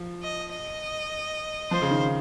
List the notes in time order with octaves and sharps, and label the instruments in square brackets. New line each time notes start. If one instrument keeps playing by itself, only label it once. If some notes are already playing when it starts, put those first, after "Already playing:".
Already playing: [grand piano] F3
[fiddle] D#5
D#5
[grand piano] F3 [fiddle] C5
[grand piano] C#3
D#3